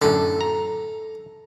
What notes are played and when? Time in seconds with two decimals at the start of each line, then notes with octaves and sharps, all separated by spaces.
0.02 F#2 A2 D3 A4
0.41 A#5